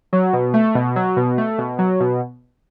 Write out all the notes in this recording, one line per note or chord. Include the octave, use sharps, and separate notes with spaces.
F#3
B2
A3
B2
F#3
B2
A3
B2
F#3
B2